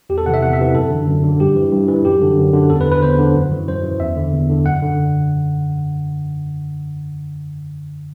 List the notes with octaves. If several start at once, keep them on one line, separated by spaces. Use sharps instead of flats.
E2 G4
A4
C3 E3 E5 F#5
E2 F#5
E5
C3 E3
F#2 A4
D3
F#2
D3
G2 G4
E3
G2
E3
F#2 G4
D3
F#2
D3
E2 A4
B4
D3
B4
E2 C5
D3
F#2
E3
F#2 C5
E3
E2 E5
D3
E2
D3
F#2 F#5
D3